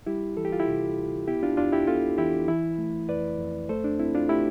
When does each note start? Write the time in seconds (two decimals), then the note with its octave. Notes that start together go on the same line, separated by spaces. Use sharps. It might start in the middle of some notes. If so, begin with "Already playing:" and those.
0.07 G3 E4 G4
0.37 E3 A4
0.45 G4
0.53 F4
0.60 E4 G4
0.67 C3
0.97 D2
1.28 B3 E4 G4
1.43 D4 F4
1.57 F2 D4 F4
1.72 E4 G4
1.87 B3 F4 A4
2.18 E3 E4 G4
2.48 E3 E4
2.78 A3
3.09 F2 B4 D5
3.39 F2
3.69 A3 A4 C5
3.84 D4
3.99 C4 E4
4.15 D4 F4
4.29 A3 E4 G4